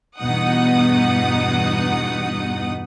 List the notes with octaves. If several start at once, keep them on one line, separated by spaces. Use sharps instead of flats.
E2 G2 B2 D#4 F#5 D#6